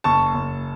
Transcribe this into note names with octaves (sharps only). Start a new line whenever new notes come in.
F#1 A5 C#6
F#1